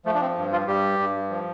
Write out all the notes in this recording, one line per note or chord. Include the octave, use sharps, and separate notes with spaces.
F3 A3
D4
C4
G2
F3 F4
G2 G3 G4
G2
F3